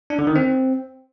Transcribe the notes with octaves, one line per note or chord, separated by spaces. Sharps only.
D4
D3
D#3
C4